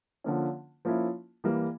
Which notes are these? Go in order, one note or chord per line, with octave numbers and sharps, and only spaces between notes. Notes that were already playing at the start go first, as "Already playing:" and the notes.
D3 F3 A#3 C#4
F3 A#3 C#4 E4
E3 G3 A#3